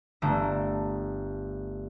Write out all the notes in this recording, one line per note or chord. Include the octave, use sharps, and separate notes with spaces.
G1 A3 A#5